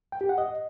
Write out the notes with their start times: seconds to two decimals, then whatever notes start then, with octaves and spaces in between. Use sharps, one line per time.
0.12 G5
0.21 G4
0.29 F#5
0.38 D#5